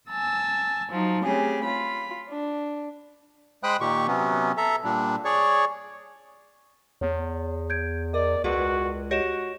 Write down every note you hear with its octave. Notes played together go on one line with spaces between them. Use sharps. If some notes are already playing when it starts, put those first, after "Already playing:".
G#5 A5 E6
F3 F#3 D#4
C#3 A3 C4 G4 G#4
F4 B5
D4
G#3 C5 G5 B5 D#6 F#6
A#2 D#3 G4 C#6
C3 F#3 B3 C#4
A4 E5 A#5
A#2 G3 D4
G#4 C#5 D5 C#6
E2 C#5
G6 G#6 D7
A#4 D5 D#5
C#2 F#4 G#4 B4 D5
F#4 G4 C#5 D#5 A#6 E7